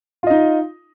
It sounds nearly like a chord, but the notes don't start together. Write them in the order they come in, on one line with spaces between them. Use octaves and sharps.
F4 D#5 D#4